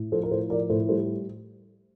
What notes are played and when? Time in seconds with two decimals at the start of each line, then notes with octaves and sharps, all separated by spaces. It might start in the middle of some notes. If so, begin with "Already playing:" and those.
Already playing: A2
0.12 F3 A4 C5
0.23 A#4
0.31 A2 A4 C5
0.50 F3 A#4 D5
0.70 A2 A4 C5
0.89 G3 A4 C5